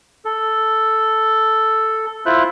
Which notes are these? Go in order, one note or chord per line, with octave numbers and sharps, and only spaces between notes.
A4
E4 F4 C5 E5 F#6